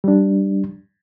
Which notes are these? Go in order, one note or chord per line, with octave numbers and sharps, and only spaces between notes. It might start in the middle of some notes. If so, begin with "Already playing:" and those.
G3 D4